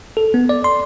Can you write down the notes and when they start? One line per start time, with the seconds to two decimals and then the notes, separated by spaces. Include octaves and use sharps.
0.17 A4
0.34 B3
0.49 D5
0.64 C6